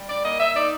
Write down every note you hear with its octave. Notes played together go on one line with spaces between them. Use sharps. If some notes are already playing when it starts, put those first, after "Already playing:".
Already playing: G3
D5
A#3 D#5
E5
D#4 D5